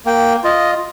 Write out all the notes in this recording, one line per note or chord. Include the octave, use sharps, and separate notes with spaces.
A#3 G5
F4 D#5